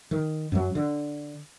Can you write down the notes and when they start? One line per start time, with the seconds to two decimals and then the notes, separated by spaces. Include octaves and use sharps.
0.11 D#3
0.52 F#2 F#3
0.75 D3